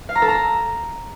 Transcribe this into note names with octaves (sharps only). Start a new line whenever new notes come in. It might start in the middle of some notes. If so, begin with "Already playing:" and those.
F5
A#5
A4
A#5